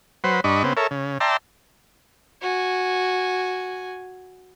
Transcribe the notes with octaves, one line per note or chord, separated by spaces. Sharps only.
F#3 B4 C5
G2 D4 D#5 B5 C#6
C#3 B3 C4
A4 A#4 C#5 E5
C#3
D5 E5 G5 A5 A#5 C6
F#4 G#5